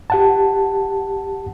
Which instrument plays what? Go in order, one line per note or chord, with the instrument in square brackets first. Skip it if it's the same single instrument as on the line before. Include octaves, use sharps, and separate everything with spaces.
[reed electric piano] G4 F#5 A5